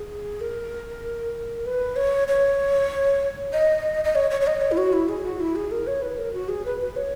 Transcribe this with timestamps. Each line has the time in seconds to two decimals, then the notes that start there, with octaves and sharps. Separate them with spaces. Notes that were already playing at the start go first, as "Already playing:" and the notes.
Already playing: G#4
0.41 A#4
1.66 B4
1.96 C#5
2.28 C#5
3.53 D#5
4.04 D#5
4.15 C#5
4.31 C#5
4.41 C#5
4.47 D#5
4.61 C#5
4.71 E4
4.77 F#4
4.93 E4
5.09 G#4
5.25 F#4
5.40 E4
5.55 G#4
5.72 A#4
5.87 C#5
6.02 B4
6.18 A#4
6.34 F#4
6.49 G#4
6.65 B4
6.80 B4
6.96 C#5